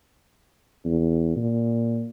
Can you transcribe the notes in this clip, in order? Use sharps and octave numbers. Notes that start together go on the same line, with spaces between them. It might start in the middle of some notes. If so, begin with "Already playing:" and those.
E2
A#2